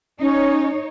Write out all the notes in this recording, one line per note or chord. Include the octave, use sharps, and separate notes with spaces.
C#4 D#4 C#5